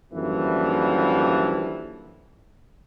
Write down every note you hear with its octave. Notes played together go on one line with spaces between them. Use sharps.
F#2 D3 E3 F3 G3 A#3